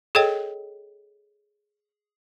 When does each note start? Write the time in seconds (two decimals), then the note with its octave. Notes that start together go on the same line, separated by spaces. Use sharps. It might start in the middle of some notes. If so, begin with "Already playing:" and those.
0.15 G#4 A4 C#5 D#5 G5